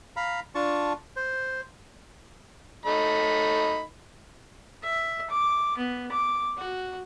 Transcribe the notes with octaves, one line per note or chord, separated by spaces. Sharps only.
F5 A#5 B5
D4 F4 A5 C#6
C5
A3 D#4 B5
E5
D6
B3
D6
F#4